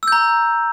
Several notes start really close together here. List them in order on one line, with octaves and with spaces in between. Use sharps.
E6 G6 A#5